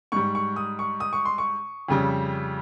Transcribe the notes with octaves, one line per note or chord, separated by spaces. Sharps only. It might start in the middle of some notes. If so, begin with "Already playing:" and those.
G#2 G3 C#6
C#6
D#6
C#6
D#6
C#6
C6
C#6
F2 C#3 G3